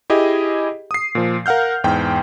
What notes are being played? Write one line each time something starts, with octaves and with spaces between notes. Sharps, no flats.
E4 G4 G#4 D#5
D#6 C7
A#2 F3
A#4 F5 F#5 F6 G6
E2 G#2 G5